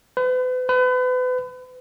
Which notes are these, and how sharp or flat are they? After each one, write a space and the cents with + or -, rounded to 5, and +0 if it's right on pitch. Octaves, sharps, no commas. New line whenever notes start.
B4 +40
B4 +35